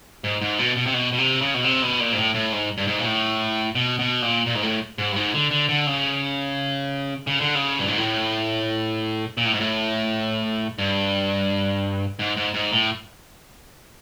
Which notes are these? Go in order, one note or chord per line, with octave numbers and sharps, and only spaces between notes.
G#2
G#2
B2
B2
C3
B2
B2
C3
C#3
B2
C3
B2
A#2
G#2
A2
A2
G#2
G2
G#2
A#2
A2
B2
B2
A#2
A#2
G#2
A2
G#2
G2
G#2
D3
D3
D3
C#3
C#3
D3
C#3
G2
G#2
A2
A#2
A2
G#2
A2
G2
G#2
G#2
G#2
A2